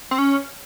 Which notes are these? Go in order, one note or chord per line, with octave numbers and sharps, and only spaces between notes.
C4
C#4